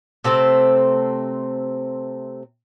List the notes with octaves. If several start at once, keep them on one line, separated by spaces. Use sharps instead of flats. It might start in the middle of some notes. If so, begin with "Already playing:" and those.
C3 A3 C4 A4